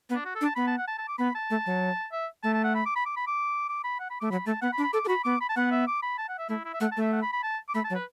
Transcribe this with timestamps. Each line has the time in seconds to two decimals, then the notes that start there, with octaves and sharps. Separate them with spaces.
0.10 B3
0.15 D4
0.25 F#4
0.35 A4
0.41 D4
0.45 A5
0.56 B3 B5
0.67 A5
0.78 F#5
0.88 A5
0.98 A5
1.08 D6
1.18 B3 B5
1.35 A5
1.50 A3
1.66 F#3
2.12 E5
2.43 A3 A5
2.54 A5
2.64 F#5
2.75 B5
2.86 D6
2.96 B5
3.06 D6
3.17 B5
3.27 D6
3.69 D6
3.84 B5
4.00 F#5
4.10 B5
4.21 A3 D6
4.30 F#3 B5
4.46 A3 A5
4.62 B3 F#5
4.73 B5
4.78 D4
4.83 B5
4.93 A4 D6
5.05 A4
5.08 F#4 B5
5.24 B3 D6
5.41 B5
5.49 A5
5.56 B3 F#5
5.71 E5
5.87 D6
6.03 B5
6.18 A5
6.29 F#5
6.38 E5
6.49 A3 E4
6.65 E4
6.74 E5
6.80 A3 F#5
6.92 A5
6.97 A3 E5
7.12 F#5
7.22 B5
7.33 B5
7.43 A5
7.69 D6
7.74 A3 B5
7.84 A5
7.90 F#3
7.95 B4